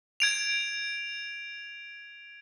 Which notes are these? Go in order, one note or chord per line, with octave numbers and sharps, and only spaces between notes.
G#6 D7 F7